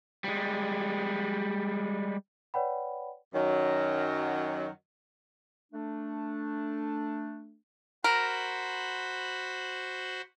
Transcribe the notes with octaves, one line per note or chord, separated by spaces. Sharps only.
G3 G#3
B4 C#5 D5 F#5 G5 B5
F#2 D#3 F#3
A3 D4
F#4 A#4 C5 B5